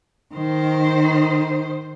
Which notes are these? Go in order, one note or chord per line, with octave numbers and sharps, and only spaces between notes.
D#3 C5